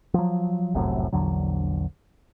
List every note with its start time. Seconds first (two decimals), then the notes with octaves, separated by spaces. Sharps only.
0.14 F3 F#3
0.74 F1 C2 F#2 A2
1.13 A#1 E2 D3 F#3